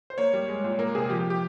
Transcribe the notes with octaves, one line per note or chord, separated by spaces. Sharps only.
C5
A#3 C#5
G3
G#3
A#2
A#3 A#4
C3 G#4
F3 G4
G4
G4